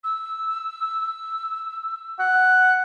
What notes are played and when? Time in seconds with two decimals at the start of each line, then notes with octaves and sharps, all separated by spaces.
0.03 E6
2.19 F#5